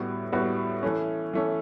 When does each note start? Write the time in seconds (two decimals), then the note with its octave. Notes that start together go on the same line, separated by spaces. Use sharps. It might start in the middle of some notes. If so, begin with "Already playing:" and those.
Already playing: A2 G3 B3 F#4
0.32 A2 G3 B3 F#4
0.83 E3 A3 C#4
1.33 E3 A3 C#4